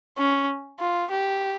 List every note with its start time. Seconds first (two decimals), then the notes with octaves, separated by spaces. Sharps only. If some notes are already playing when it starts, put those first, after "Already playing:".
0.18 C#4
0.79 F4
1.11 G4